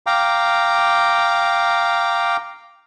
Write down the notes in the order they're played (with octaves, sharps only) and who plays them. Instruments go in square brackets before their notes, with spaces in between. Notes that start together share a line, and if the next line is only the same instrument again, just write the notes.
[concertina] F5 G5 A#5 D6